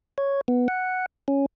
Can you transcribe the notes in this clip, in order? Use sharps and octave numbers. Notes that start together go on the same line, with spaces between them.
C#5
B3
F#5
C#4